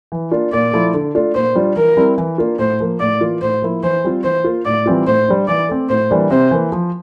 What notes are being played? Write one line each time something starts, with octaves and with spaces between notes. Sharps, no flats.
E3
A#3 D4 F4
A#2 D5
F3 A3 E4
D3
A3 D4 F4
A#2 C5
G3 D4 F4
E3 A#4
G3 C4 E4
E3
A#3 D4 F4
A2 C5
F3 A#3
A2 D5
E3 A#3 F4
A2 C5
F3 A#3 E4
E3 C5
G3 C4 F4
E3 C5
A#3 F4
A2 D5
E3 G3 C4 F4
A2 C5
G3 D4
E3 D5
A3 C4
A2 C5
E3 G3 A#3 D4
C3 C5
E3 A#3
F3